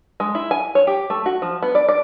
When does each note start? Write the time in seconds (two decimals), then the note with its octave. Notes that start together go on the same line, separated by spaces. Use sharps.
0.20 G#3
0.35 E4
0.51 G#5
0.75 C#5
0.87 G4
1.10 A3
1.26 F#4
1.42 F3
1.63 B3
1.75 D5
1.89 D5